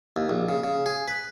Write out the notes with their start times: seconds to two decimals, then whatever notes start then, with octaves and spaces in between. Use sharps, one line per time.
0.16 D#2
0.29 A#1
0.49 C#3
0.64 C#3
0.86 G#4
1.08 B4